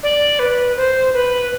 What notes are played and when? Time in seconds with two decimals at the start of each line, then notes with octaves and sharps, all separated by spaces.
0.03 D5
0.39 B4
0.77 C5
1.14 B4